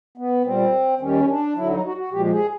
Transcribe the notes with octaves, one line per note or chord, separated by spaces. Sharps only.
B3
A#2 G3 C4
D#2 D#3 G3 C#4
D4
D2 D3 F#3 E4
D#4
F#4
F#4
A#2 F3 G#3 G4
G4
G#4